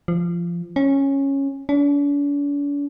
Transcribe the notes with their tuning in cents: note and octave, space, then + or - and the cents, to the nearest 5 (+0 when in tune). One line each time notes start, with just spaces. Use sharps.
F3 -20
C#4 -10
D4 -45